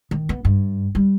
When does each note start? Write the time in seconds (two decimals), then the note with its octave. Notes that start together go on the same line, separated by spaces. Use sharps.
0.11 D#3
0.29 B3
0.45 G2
0.95 G3